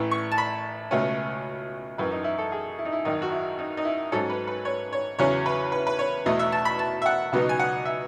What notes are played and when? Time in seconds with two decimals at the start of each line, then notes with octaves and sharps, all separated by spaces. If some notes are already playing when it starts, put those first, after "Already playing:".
Already playing: A1 A2 E3
0.11 C#6
0.32 A5
0.38 B5
0.91 C#2 B2 A3 C#4
1.98 G#1 F#2 E3 B4
2.11 D#4
2.24 E4
2.38 A4
2.52 G#4
2.79 E4
2.85 D#4
2.93 E4
3.05 G#1 F#2 D#3 D#4
3.22 F#4
3.32 E4
3.59 D#4
3.77 D#4
3.85 E4
4.12 G#2 F#3 C#4 A4
4.30 B4
4.47 B4
4.65 C#5
4.93 C#5
5.19 E2 C#3 F#3 C#4 C#5
5.46 B4
5.72 B4
5.87 B4
5.99 C#5
6.26 E2 B2 A3 D#5
6.39 E5
6.52 A5
6.65 B5
6.79 A5
7.02 E5
7.06 F#5
7.32 C#2 B2 F#3 B3 D#4
7.49 G#5
7.60 F#5
7.85 E5